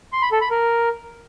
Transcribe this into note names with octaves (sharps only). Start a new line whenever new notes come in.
C6
B5
A4
B5
A#4